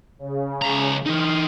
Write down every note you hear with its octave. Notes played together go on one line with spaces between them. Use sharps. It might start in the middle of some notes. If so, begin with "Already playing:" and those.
C#3
C#2 A#5
E3 D#4 C6 D#6 F6